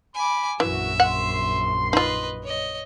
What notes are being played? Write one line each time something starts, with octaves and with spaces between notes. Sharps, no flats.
G#5 B5 D6
A#1 F#2 E3 F#4 E5
F#5 C6
D#4 F4 B4 D#5
C#5 D#5